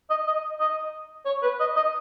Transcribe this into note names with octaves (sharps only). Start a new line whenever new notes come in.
D#5
D#5
D#5
C#5
B4
D#5
D#5